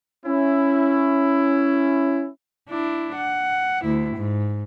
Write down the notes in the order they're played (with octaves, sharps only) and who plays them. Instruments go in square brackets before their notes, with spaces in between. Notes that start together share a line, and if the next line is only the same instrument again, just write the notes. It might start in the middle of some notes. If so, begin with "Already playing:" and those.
[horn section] C#4 E4
[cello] D4 E4
F#5
D2 E4
G#2